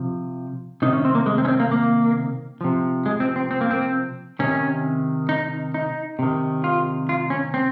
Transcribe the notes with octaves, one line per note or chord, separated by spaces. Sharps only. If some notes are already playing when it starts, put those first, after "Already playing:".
Already playing: C3 F3
C3 D#3 D#4
C#4
C4
A#3
G#3
C4
C#4
C4
A#3
A#3
C3 F3
G#3
C4
C4
C4
A#3
C4
C3 D#3 C#4
D#4
D#4
C3 D#3
F4
F4
C#4
C4